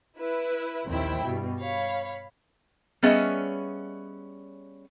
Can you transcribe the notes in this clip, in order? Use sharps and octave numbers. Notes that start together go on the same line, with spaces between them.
E4 B4
A#1 D#2 C4 E4 G5
G2 B2 G3
C#5 F5 B5
G3 B3 C#4 G#4 D#5 E5